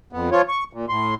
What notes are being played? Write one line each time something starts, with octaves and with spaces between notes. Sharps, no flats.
F2 B3
F3 F4 C#5
C#6
A#2
A2 C6